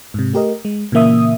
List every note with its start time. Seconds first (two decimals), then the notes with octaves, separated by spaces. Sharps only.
0.14 G#2 C3
0.33 A3 G4 A#4 D#5
0.65 G#3
0.92 A#2 C#3 E3 A#3 E5 D#6